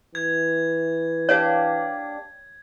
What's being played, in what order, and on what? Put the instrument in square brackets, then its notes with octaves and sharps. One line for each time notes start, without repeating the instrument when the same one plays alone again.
[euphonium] E3 [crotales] G#6
[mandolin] A#3 D4 G4 [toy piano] C#5